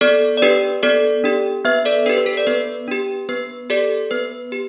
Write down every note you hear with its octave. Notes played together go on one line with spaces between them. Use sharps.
B3 A4 D5
D5
D4 G4 B4
B3 A4 D5
D4 G4
B3 B4 E5
A4 D5
D4 G4 B4
B4
A4
D5
B3 B4
D4 G4
B3 B4
G4 A4 D5
B3 B4
G4